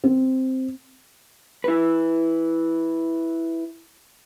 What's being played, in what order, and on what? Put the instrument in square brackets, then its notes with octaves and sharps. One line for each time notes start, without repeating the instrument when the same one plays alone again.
[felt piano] C4
[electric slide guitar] E4 B4